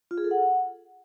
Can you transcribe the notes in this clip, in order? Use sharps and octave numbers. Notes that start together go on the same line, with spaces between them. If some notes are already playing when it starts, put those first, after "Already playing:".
F4
G#4
A4
F#5